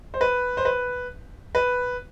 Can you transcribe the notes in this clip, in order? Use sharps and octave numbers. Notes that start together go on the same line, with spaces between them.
C5
B4
C5
B4
B4